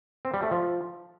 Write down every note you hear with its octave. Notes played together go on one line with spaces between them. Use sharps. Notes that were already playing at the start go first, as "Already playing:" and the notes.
C4
G3
A3
F3